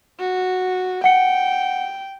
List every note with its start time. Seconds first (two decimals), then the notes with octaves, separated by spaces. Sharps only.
0.19 F#4
1.04 F#5 G5 C#7